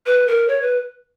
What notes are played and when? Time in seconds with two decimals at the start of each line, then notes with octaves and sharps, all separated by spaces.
0.06 B4
0.28 A#4
0.48 C#5
0.62 B4